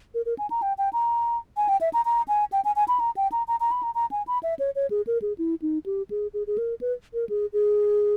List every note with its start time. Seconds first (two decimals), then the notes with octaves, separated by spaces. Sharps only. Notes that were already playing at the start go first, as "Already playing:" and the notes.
0.15 A#4
0.26 A#4
0.38 G#5
0.50 A#5
0.62 G5
0.78 G5
0.93 A#5
1.57 G#5
1.69 G5
1.81 E5
1.93 A#5
2.05 A#5
2.28 G#5
2.52 G5
2.65 G#5
2.76 G#5
2.88 B5
3.00 A#5
3.17 G5
3.32 A#5
3.48 A#5
3.60 A#5
3.71 B5
3.83 A#5
3.95 A#5
4.11 G#5
4.27 B5
4.43 E5
4.59 C#5
4.75 C#5
4.90 G#4
5.07 A#4
5.22 G#4
5.38 E4
5.62 D#4
5.86 G4
6.11 G#4
6.34 G#4
6.47 G#4
6.58 A#4
6.81 B4
7.14 A#4
7.29 G#4
7.53 G#4